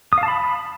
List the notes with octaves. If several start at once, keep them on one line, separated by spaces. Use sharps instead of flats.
D#6
F5
A5
B5